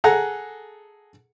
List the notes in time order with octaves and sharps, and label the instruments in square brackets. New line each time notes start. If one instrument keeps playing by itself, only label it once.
[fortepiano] G#4 A4 F#5 A#5